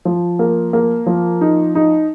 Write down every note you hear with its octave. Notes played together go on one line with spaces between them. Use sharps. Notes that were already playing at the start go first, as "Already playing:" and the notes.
F3
A#3
A#3
F3
D#4
D#4